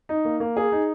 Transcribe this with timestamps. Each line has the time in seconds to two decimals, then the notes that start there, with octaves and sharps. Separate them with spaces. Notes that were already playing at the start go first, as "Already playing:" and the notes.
0.09 D#4
0.25 A#3
0.40 A#3
0.57 G#4
0.72 D#4